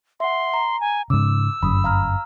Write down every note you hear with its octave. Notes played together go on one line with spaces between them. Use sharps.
E5 F#5 C6
A#5
G#5
G#2 C#3 D6 E6
G1 F#2 B5 D#6
F5 A#5 F6